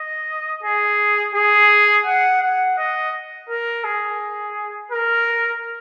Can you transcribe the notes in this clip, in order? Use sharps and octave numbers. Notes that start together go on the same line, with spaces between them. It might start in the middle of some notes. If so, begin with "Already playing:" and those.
Already playing: D#5
G#4
G#4
F#5
F#5
D#5
A#4
G#4
A#4